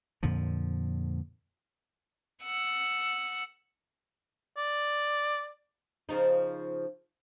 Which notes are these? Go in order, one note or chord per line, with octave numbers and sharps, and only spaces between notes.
F2 A#2 D3 F3
F#5 E6
D5
C#3 F3 D#4